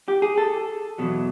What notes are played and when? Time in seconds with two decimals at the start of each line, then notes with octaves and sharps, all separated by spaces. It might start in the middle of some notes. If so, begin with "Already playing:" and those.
0.08 G4
0.22 G#4
0.38 A4
0.98 E2 B2 F#3